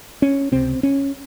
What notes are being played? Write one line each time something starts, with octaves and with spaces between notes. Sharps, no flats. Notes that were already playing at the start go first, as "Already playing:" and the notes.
C#4
C#2 C3 C4
C#4